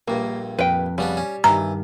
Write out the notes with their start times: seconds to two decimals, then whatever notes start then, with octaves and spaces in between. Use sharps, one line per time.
0.08 A#1 G2 A#3
0.59 F2 B4 G5
0.98 C#3 G3 B3 D4
1.17 C#4
1.44 G2 D#3 E3 A#5